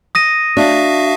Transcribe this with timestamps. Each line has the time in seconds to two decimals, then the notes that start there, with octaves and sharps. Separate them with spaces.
0.15 D#6 A#6 D#7
0.57 D4 F#4 E5 F5